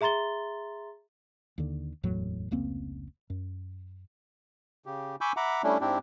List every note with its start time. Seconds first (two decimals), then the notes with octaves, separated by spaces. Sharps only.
0.01 G#4 E5 A#5 C6 A6 G7
1.58 D#2 D3
2.03 F#1 E2 A2 F#3
2.51 F1 C#2 A#3 C4
3.30 F#2
4.86 C#3 G4
5.21 G#5 B5 C#6 D6 E6 G6
5.37 E5 F#5 A#5 B5 D6
5.63 G3 A3 C#4 D4 E4
5.81 G#2 C4 D4 E4 G4